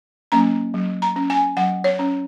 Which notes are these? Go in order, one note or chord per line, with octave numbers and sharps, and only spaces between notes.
F#3 A#3 C#4 A#5
F#3
A#5
C#4
G#5
F#3 F#5
C#5
C#4